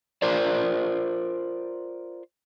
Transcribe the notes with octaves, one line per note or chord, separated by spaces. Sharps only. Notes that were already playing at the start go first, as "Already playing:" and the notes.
F4 A#4 C5 D5